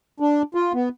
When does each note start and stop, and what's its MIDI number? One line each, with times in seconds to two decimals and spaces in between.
0.20 0.42 62
0.55 0.73 65
0.74 0.89 59